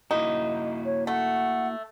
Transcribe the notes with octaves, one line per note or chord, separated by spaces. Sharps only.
A#3 D#4 E4 F#4
C#5
A3 F#5